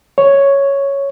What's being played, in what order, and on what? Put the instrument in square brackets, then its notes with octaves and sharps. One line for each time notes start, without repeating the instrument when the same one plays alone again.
[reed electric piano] C#5